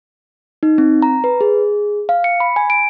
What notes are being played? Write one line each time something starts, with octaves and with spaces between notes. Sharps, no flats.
D#4
C4
A#5
B4
G#4
F5
C#7
B5
G#5
D7